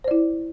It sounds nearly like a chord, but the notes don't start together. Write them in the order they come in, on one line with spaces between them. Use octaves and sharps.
C5 D5 E4